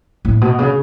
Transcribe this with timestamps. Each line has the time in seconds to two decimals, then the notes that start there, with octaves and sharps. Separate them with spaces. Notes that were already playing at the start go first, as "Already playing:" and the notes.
0.25 A2
0.41 B2
0.59 C#3